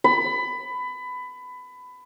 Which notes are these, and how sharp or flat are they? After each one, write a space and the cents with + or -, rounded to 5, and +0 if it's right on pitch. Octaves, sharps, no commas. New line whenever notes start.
B5 +20